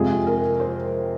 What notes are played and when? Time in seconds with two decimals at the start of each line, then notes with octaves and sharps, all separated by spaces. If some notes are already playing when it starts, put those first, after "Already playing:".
Already playing: F2 C3 F3 G#3 G#4
0.26 A#4
0.60 C5